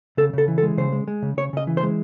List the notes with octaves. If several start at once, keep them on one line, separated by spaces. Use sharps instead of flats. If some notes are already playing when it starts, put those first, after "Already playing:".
C#3 A4
C#3 A4
E3
A4
G#3
C#3 C5
G#3
G#3
C#3
C#3 C#5
C#3 D#5
E3
C5
G#3